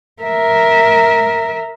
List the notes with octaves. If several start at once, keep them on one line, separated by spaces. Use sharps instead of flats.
A#4 E5